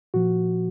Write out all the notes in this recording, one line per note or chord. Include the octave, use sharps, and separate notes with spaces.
A#2 F3 F#4